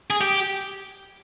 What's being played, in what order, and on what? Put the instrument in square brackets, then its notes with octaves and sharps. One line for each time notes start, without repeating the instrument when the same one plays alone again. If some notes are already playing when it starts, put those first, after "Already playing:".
[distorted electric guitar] G#4
G4